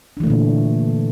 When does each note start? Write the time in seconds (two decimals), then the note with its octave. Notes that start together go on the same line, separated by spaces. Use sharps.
0.17 D4
0.20 E3
0.23 A3
0.27 D3
0.30 A#2